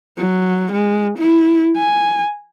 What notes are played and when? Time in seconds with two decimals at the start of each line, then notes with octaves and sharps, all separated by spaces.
0.18 F#3
0.73 G#3
1.19 E4
1.77 G#5